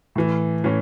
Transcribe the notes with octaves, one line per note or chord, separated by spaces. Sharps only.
A2 E3
A2 E3 C#4